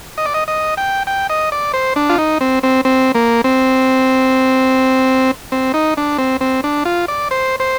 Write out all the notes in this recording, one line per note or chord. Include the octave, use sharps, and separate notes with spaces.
D#5
D5
D#5
D#5
G5
G5
D#5
D5
C5
D4
F4
D#4
C4
C4
C4
A#3
C4
C4
D#4
D4
C4
C4
D4
F4
D5
C5
C5